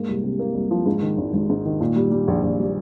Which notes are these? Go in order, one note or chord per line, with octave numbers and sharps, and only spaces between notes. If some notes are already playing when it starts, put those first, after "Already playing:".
Already playing: G#2 A#3
C2
C3
A#3
C2
F3
G#2
D#3
G#1
G#1
G#2
D#3
A#2
G3
G3
A#1
A#1
G3